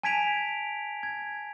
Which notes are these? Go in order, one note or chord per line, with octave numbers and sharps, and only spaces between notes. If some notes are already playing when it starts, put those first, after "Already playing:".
G#5 A5 G#6 B6 D7 F7
G#6